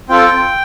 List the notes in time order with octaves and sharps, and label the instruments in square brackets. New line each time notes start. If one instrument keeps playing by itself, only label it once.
[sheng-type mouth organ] C4 F4 A4 G5